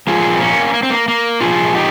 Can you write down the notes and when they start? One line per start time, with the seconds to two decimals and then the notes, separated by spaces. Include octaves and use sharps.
0.07 A#2 F3 F4 G#4
0.33 C4
0.40 A#3 C#4
0.74 A#3
0.83 C4
0.90 A#3
1.08 A#3
1.41 A#2 F3 F4 G#4
1.75 D#4 G4